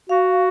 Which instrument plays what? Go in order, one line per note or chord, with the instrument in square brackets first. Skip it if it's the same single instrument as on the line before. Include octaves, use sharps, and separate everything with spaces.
[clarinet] F#4 [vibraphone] F5